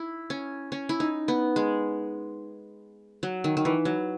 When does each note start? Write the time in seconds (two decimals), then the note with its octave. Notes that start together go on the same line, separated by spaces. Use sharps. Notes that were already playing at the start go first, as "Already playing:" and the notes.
Already playing: E4
0.30 C#4
0.72 C#4
0.89 E4
1.00 D#4
1.28 B3
1.56 G#3
3.23 F#3
3.44 D#3
3.57 D#3
3.65 E3
3.85 F#3